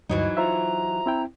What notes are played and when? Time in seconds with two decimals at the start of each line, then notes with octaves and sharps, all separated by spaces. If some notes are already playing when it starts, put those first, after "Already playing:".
0.09 D2 G2 E3 F#3 D#4 D#5
0.37 F4 C5 E5 A#5
1.06 C4 E4 G5